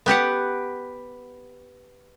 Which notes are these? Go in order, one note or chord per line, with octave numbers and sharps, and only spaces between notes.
B3 G4 B4 F#5